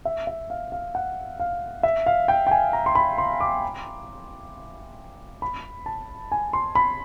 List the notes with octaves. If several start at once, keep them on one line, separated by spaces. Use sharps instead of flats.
E5
E5
F5
F5
F#5
F5
E5
F5
G5
G5
G#5
A#5
C6
B5
C6
D6
B5
A5
G#5
C6
B5